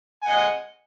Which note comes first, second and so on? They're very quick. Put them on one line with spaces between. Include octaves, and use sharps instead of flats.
G#5 F#5 D#5